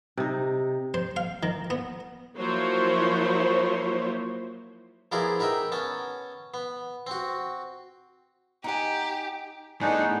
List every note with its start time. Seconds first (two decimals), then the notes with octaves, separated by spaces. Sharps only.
0.17 C3 D#4
0.94 C5
1.16 F5
1.43 D#3
1.70 B3
2.36 F3 F#3 A#3 E4 C5 C#5
5.12 F3 B3 E4 G#4 A#4 D5
5.39 D#4 A#4 B4 E5 G5
5.72 B3 C#4 A5
6.54 B3
7.07 C4 F#4
8.64 D#4 G4 F#5 G#5
9.81 A2 G#3 A3 B3 D4 D#4 G#5